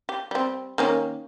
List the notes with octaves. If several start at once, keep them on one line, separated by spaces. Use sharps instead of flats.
G4
G3 C4
D#3 A#3 C#4